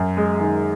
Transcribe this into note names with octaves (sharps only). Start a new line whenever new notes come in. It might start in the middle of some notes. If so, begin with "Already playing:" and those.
Already playing: F#2
G#3
D#3